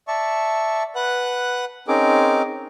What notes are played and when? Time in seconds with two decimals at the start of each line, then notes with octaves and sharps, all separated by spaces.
0.08 D5 E5 A5 C#6
0.95 B4 F#5 F#6
1.88 C4 C#4 D#4 G#4 A#4 D6